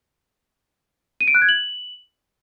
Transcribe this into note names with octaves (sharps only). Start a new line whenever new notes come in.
D#7
D7
F#6
G#6
F#7